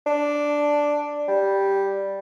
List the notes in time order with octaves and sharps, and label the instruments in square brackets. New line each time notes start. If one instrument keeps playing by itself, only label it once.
[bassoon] D4
G3